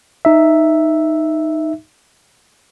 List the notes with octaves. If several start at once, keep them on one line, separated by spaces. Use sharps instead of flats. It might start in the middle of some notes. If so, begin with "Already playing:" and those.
D#4 E5